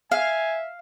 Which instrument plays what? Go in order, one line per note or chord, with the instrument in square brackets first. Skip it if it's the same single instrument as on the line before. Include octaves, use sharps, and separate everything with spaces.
[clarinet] E5 [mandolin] F5 [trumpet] G#5